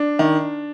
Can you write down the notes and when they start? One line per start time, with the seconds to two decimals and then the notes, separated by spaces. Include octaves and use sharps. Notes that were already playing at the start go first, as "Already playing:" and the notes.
Already playing: D4
0.19 D#3